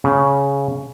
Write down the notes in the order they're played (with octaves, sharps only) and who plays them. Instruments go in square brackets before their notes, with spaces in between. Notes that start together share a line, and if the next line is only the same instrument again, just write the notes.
[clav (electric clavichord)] C#3